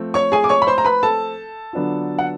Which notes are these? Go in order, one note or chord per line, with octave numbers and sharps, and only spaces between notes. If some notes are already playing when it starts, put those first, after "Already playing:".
Already playing: F3 A3 C4
C#5 C#6
G#4 G#5
D6
C#5 C#6
B5
C5 C6
A#5
B4 B5
A4 A5
D3 F#3 B3 D4 F4
F#5